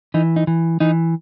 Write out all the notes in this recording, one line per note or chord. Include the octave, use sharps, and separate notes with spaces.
E3 D#4
D#4
E3
E3 D#4